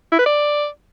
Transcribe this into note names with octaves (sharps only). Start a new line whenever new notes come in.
E4
B4
D5